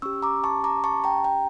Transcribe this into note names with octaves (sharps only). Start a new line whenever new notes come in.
C#4 G4 C#6 E6
A#5 D6
A5 C#6
A#5 D6
A5 C#6
G5 A#5
G5 A#5